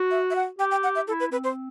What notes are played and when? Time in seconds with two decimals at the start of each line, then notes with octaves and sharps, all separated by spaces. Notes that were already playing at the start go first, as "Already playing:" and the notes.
Already playing: F#4
0.11 E5
0.31 E5
0.35 F#5
0.59 G4 G5
0.71 G5
0.83 F#5
0.95 E5
1.08 E4 A4
1.20 B4
1.31 C4 B4
1.44 C5